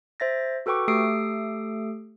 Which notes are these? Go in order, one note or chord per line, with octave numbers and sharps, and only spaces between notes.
C5 E5 A6 A#6
F#4 A4 B4 G5 C#6 D6
A3 G4 A4 D#6 C7 D7